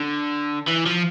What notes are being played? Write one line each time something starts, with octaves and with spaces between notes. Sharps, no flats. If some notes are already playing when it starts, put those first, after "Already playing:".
Already playing: D3
E3
F3